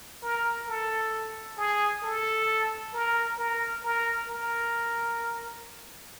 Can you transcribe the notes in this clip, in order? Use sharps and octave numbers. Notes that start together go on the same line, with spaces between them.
A#4
A4
G#4
A4
A#4
A#4
A#4
A#4